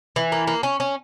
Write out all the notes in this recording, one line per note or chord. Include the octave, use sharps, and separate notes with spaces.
E3
A#3
A#3
C#4
C#4